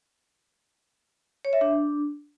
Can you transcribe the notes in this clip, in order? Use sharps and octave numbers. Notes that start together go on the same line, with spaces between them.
C#5
E5
D4